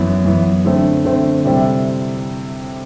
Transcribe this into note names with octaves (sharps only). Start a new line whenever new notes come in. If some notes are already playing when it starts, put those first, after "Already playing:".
Already playing: F#2 E3 B3
F#2 E3 B3
D3 A3 C4
D3 A3 C4
C3 G3 C4 E4 A4